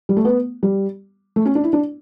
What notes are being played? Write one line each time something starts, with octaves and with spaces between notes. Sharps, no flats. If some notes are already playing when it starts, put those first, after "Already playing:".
G3
A3
B3
G3
A3
C#4
D4
E4
D4